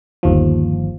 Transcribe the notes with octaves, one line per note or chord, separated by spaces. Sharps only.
G1 D#2 F3